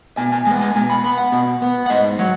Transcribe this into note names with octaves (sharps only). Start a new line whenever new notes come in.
B2 G#5
G#5
G#3 B3 G#5
G#5
B2 G#5
B5
B3 B5
F#5
B2
B3
F#5
G#2 D#5
F#3 F#5